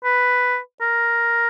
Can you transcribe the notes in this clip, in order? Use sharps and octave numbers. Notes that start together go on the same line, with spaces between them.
B4
A#4